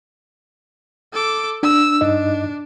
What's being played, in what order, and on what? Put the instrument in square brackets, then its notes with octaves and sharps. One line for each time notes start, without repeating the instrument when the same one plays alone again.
[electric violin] A4 D6
[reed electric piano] D4 [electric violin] E6
[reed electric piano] G2 D#4 D#5 [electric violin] D4